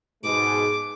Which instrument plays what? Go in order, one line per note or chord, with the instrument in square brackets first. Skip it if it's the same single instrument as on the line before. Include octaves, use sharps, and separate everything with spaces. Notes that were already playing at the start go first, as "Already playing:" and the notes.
[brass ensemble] G#2 B2 G#3 [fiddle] D6